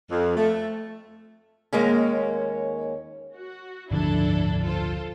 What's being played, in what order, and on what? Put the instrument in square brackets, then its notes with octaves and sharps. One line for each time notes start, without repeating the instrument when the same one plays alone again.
[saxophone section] F2
A3
[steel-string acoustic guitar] D#2 G#3 A#3 C#4
[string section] F#4
[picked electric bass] F#1 D2 F3 [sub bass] G#2 [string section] D4 E4 A4
[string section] F4 A4 C5